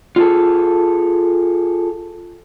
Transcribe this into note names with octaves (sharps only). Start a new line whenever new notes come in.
F4 G#4 A4